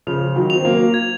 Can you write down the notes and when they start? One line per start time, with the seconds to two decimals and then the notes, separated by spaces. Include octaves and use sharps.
0.07 C#3 F3 F7
0.36 D#3 F#3
0.50 F7
0.55 C4
0.65 F#3 A#3
0.94 G#6